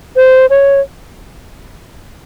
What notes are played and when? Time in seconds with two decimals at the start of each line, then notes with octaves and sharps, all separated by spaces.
0.16 C5
0.50 C#5